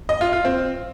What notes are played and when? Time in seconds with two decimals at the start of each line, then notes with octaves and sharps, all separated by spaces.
0.09 D#5
0.21 F4
0.33 F4
0.45 C4